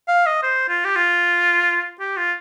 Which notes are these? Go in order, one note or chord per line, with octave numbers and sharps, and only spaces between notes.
F5
D#5
C5
F4
G4
F4
G4
F4